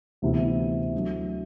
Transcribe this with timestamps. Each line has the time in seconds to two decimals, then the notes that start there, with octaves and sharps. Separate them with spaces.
0.22 D2 C3 E3 B3 E4
0.93 F#3 A3 D4